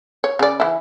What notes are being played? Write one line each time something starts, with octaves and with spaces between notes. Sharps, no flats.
C#5
C#3 D5
E3 E4